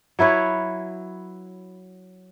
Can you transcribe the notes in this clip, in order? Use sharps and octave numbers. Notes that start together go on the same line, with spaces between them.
F#3 E4 B4 C#5